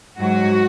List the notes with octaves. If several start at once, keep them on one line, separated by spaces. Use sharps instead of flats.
G#2 F#3 F#4